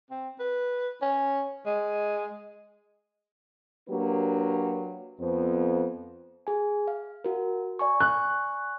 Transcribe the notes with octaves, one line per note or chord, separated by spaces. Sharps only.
C4
B4
C#4
G#3
F#3 A#3 D4 F#4 G4 B4
F2 B3 C5
G#4 G#5
F5
F#4 A#4
D5 G#5 C#6
F#6